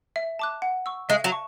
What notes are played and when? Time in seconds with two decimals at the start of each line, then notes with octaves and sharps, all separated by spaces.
0.16 E5
0.39 A5 D6 F#6
0.62 F#5
0.86 C#6 E6
1.09 G#3 E5
1.24 F#3
1.32 A5 C#6